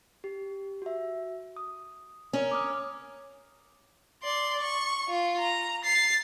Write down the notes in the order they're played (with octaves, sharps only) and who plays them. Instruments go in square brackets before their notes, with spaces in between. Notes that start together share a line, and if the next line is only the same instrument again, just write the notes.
[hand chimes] G4
F#4 E5
D#6
[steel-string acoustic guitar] C#4 A#4
[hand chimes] D6 D#6 F6
[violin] D5 C6
C#6
F4
A#5
A6 C7